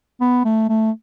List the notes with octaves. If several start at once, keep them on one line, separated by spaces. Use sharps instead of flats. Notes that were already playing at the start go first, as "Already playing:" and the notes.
B3
A3
A3